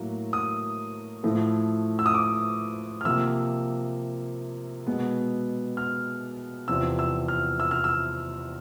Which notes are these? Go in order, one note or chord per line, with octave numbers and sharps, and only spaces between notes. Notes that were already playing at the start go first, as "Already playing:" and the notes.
Already playing: A2 F#3 A#3
D#6
A2 F3 A3
E6
D#6
D6
F6
C3 F3 A#3 E6
B2 G#3 B3
F6
E2 C3 F3 E6
E6
F6
E6
F6
E6